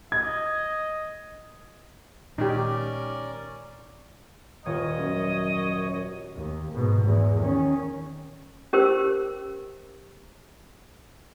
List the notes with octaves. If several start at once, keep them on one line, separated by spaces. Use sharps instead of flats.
D#5 G#6
A#2 D#3 G#3 C#4 D#4 G4 A#4 D5
D#1 F4 C#5 D#5 C#7
F#2 C#4
D#2
G#2 B2
E2 G#2
D#3 C#4
C#4 G4 A#4 C5 E6